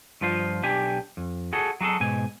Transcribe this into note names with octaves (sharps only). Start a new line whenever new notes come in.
G2 F3 F4 C5
B1 D4 G4 G#5
F2
F#4 G#4 A4
F#3 F#4 G#4 A4
G#2 B2 G#5